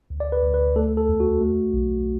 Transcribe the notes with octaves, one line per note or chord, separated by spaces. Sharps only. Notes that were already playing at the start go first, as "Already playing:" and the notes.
D2
D5
B4
D2
B4
A3 A4
A4
E2
F#4
A3
B1